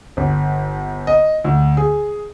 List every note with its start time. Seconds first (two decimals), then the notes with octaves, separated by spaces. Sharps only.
0.17 G1
1.07 D#5
1.44 D2
1.77 G#4